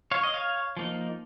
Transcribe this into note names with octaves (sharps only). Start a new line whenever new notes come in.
C#5 F5
D#5
C#5 F5
F3 A#3 D#4